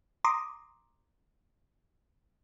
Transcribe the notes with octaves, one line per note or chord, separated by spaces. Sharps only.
A#5 C6 D6 D#6